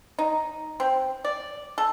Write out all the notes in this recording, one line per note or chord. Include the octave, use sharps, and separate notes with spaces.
D#4
C4
D5
A4